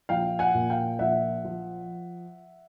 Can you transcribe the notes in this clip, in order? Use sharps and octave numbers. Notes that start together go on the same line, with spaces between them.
A#1 F5 G5
F#5 G#5
A#2
F5 G5
A#1 E5 F#5
F3